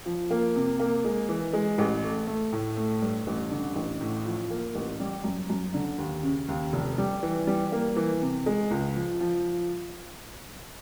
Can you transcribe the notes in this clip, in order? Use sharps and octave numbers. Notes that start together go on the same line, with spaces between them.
F3
A#3
C3
A#3
G#3
E3
G#3
A1
A3
A3
A2
A3
G2
A1
D3
A1
A2
F3
A#3
A1
G3
F#2
F#2
D3
D#2
C#3
D#2
F1
G3
E3
G3
A#3
E3
C3
G#3
C#2
F3
F3